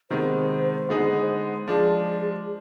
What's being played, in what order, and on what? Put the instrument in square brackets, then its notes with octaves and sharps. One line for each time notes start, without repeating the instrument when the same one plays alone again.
[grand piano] C3 D#3 G#3 B3 [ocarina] C5
[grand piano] D3 G#3 B3 D#4 G#4
[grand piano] F3 G#3 D4 [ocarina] G#4